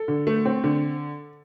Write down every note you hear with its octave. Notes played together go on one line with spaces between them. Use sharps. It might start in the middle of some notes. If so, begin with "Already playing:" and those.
Already playing: A4
D3
A3
C4
D3